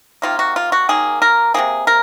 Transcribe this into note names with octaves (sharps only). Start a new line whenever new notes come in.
C3 D#3 A#3 F4
F#4
F4
F#4
D#3 F#3 A#3 G#4
A#4
C3 F3 A#3 G#4
A#4